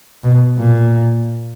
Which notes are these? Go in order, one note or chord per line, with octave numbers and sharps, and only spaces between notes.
B2
A#2